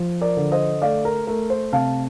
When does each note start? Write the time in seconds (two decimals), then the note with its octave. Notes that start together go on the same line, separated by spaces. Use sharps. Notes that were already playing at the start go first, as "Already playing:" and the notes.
Already playing: F3
0.21 A#4 D5
0.37 D3
0.52 C5 D#5
0.82 A3 D5 F5
1.05 A#4
1.27 A3 A#4
1.50 C5
1.72 C3 F5 A5